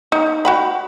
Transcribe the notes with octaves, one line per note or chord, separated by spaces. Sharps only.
D#4
F#4 G5 B5